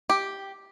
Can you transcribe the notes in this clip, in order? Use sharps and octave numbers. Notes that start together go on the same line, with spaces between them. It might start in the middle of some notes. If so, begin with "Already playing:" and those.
G4